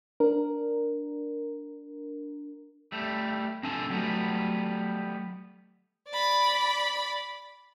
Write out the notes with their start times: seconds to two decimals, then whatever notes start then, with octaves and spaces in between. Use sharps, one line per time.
0.20 D4 A#4
2.92 G3 A3
3.63 C4 D4 A4 G#5 A5
3.90 F#3 G3 A3 B3
6.10 D5 B5